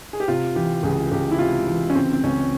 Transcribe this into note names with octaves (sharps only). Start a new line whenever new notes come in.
G#4
G4
C3 F4
E3 G4
C#2 G#4
C#2 G4
E4
C3 F4
E3
C#4
C#2 C4
C4
C#2 C#4